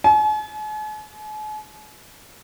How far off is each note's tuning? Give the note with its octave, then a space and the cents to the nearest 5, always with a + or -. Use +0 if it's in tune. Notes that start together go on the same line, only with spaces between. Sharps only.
G#5 +45